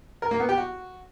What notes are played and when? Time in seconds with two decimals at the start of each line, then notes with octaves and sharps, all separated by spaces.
0.22 A#4
0.31 A#3
0.40 B3
0.49 G4
0.58 F#4